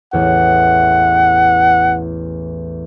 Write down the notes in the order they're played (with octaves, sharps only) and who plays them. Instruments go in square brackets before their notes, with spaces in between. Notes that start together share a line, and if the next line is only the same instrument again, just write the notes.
[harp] A1 E2 [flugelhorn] F#5